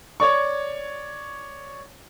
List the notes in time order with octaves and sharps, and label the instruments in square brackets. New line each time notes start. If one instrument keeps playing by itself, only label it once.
[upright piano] C#5 D5 C#6